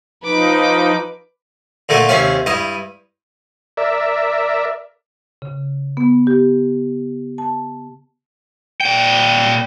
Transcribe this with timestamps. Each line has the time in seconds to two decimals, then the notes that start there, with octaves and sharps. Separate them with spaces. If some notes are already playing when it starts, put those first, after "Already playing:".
0.24 F3 D#4 B4 D6
1.89 A#2 D3 A3 A#3
2.09 D#2 C3 C#4 E5 F5
2.46 G2 E4 D#6
3.77 A#4 D5 E5
5.42 C#3
5.97 B3
6.27 G4
7.38 A5
8.81 A#2 G5